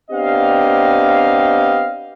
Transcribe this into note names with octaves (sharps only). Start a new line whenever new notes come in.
B3 C4 D4 G4 D#5 F5